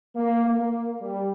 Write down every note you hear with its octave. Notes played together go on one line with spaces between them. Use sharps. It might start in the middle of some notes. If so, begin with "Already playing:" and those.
A#3
A#3
G3